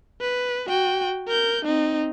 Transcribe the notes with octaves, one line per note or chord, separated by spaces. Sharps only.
B4
F#4 G5
A#4 G6
C4 D#4